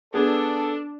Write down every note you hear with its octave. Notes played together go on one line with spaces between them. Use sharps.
B3 D4 G#4 A4